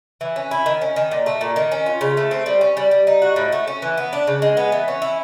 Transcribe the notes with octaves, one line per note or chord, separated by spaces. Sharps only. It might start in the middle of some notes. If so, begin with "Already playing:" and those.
E3
C#4
E4
D#3
C#4
D#3
A#2
A3
A#2
D#3
C#4
F4
C#3
A3
C4
G3
C#4
G3
G3
D#4
F#4
A2
A3
C#4
E3
B3
D4
C#3
G#3
B3
E3
C#4
E4